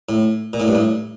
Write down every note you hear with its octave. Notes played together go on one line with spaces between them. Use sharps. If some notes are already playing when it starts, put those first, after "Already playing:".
A2
A#2
A2
G2
A2